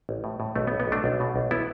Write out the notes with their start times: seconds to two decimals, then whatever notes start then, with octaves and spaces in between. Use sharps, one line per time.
0.09 A1
0.24 A2
0.40 A2
0.56 B1 A3
0.67 B3
0.72 B1
0.80 B3
0.88 B1 A3 D4
1.04 B1
1.20 B2
1.36 B1
1.51 B3 E4